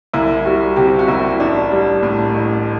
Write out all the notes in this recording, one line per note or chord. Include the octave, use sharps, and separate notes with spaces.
C2 E4
G3 F#4
C3 G4
F#4
C2 E4
A1 D4
G3
A2
A1